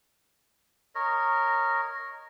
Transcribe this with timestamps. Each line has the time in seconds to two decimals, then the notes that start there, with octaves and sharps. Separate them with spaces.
0.95 A#4 C#5 D#5